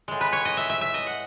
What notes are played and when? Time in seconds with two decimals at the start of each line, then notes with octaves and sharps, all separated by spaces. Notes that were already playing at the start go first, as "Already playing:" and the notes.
0.08 A2 G#3
0.21 B4
0.33 C#5
0.45 D#5
0.57 E5
0.70 E5
0.81 E5
0.94 D#5
1.07 F#5